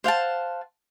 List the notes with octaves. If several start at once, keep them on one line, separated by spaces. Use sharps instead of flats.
C5 F5 F#5 A5